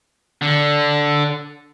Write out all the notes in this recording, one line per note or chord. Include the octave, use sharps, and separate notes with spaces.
D3